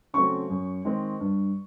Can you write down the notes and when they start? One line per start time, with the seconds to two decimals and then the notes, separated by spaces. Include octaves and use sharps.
0.14 C#3 F#3 A3 C4 C#6
0.50 F#2
0.85 D#3 G#3 C4
1.20 G2